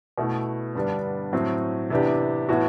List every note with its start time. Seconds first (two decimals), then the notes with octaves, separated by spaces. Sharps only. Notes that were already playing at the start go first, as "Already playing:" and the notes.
0.18 B2 A3 E4
0.75 G2 D3 G3 B3 D4
1.33 A2 F#3 C4
1.90 C3 E3 B3 D4 G4
2.49 A2 E3 B3 F#4